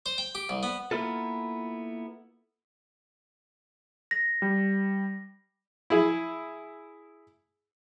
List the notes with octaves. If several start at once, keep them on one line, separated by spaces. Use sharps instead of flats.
C5
G5
G4
C2
B3
A#3 B3 E4 F4 A4
A#6
G3
E4 G#4